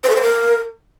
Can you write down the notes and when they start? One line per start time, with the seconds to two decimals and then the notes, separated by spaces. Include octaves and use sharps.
0.04 C5
0.10 A4
0.16 C5
0.22 A#4